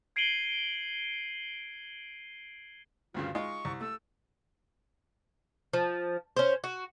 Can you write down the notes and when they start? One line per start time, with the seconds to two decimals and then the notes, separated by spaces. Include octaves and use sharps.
0.16 G#6 C7 D7 D#7 F#7 G7
3.14 D2 G2 C#3 F4
3.35 G#3 D#4 F4 C#6
3.65 C2
3.81 A3 E6
5.73 F3
6.37 C#4 C5
6.64 F#4